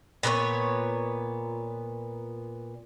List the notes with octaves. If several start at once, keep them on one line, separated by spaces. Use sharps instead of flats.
A#2 B3 E4 C#5